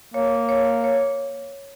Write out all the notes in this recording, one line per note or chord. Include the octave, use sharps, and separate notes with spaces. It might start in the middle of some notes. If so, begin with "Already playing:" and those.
A#3 C#5
C#5
C#5